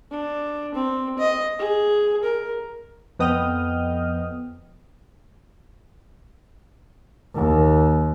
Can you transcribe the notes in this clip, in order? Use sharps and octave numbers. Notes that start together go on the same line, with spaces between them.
D4
C4
D#5
G#4
A#4
F2 B3 D#5 G5 D#6 F6
D#2